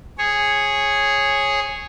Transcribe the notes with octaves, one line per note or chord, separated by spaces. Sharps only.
G#4 C#5